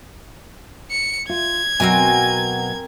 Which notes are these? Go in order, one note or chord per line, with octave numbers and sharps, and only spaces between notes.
C#7
F4 G#6
B2 F#3 C4 A#4 G#5